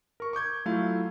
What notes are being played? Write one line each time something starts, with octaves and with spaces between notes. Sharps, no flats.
A#4 C#6
C#6 D6 G6 G#6
F#3 A3 E4 F4 F5